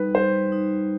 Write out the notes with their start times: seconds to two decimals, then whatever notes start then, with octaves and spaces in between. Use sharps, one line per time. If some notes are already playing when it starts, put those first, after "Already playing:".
Already playing: G3 D#4 B4
0.15 G3 C5
0.52 D#4